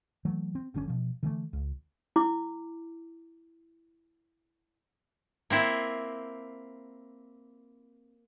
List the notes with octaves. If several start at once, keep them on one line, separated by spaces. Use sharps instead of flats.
E3 F#3 A3
C4
F1 D3 C4 C#4
B2 F3
D3 E3 A3
C#2
E4 D6
A#3 C4 E4